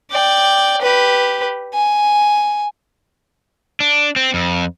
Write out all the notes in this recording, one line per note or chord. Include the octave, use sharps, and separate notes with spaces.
D5 G5
G4 B4
G#5
D4
C4
F2